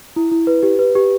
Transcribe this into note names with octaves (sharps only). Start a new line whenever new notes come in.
E4
E4
B4
G4
B4
G4